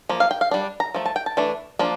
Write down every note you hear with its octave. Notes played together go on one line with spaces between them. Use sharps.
F3 A#3
F5
G5
F5
G3 D4
A#5
F3 A3
A5
G5
A5
E3 A3 D4
F3 A#3 D4